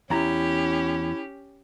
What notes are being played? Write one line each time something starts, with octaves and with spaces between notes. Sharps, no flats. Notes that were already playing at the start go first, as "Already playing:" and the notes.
E2 C#4 E4 G4 A#5